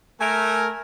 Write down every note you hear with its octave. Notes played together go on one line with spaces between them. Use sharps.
A3 A#4 G#5